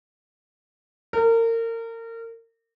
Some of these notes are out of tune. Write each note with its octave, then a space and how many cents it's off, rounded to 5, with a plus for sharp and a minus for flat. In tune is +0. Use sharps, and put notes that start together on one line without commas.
A#4 -30